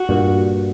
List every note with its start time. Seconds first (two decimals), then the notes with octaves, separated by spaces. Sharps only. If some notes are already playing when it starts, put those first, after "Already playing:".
Already playing: F#4
0.09 G2 A#2